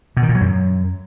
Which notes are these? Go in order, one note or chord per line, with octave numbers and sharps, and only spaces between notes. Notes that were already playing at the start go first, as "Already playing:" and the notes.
B2
D#3
A#2
F#3
F#2